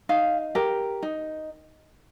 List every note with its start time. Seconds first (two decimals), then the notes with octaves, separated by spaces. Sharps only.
0.09 D#4 F5
0.55 G4 A#4
1.03 D#4